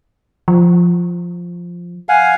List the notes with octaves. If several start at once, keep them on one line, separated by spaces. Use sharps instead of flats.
F3
F5 F#5 G#5